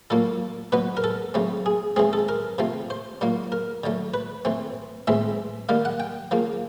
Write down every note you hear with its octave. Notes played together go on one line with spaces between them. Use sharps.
A#2 F#3 A#3 A4
B2 F#3 B3 B4
A#4
A4
C#3 F#3 A3 C4
G#4
E3 G#3 C4 G#4
A4
A#4
C3 F3 A3 C4
C5
A#2 F#3 A#3
A#4
D3 F#3 A3
B4
E3 A3 C4
A2 E3 G#3 C4 E5
D#3 G3 A#3 F5
F#5
G5
C#3 F3 A#3